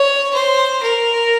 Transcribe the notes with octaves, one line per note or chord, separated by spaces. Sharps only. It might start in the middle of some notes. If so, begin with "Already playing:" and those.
Already playing: C#5
C5
A#4